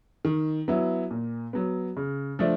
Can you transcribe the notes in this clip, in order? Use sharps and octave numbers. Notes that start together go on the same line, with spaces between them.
D#3
F#3 B3 E4
A#2
F#3 B3
C#3
F3 A3 D4